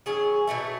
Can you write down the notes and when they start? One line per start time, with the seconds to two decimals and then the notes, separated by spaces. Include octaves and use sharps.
0.06 D#3 F#3 C#4 G#4
0.47 B2 F#3 A3 E4